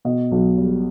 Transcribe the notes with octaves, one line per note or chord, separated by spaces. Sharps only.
B2 D#5
B1
G3